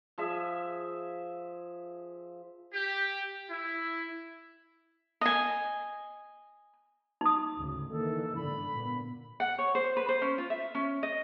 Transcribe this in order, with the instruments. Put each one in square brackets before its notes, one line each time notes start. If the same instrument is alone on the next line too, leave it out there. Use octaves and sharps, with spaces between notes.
[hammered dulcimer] F3 G#4 E5
[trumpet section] G4
E4
[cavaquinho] D#5 G#5
[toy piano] D#4 D#6
[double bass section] G#1 D2 C#3
[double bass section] D#3 E3 A#3 [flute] A4
[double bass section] G1 G#2 D3 [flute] B5
[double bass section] A#2 B3
[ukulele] F#5
C#5
C5
B4
C5
C#4
F4
E5
C#4
D#5